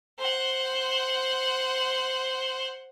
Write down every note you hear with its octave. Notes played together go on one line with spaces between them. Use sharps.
C5 F#5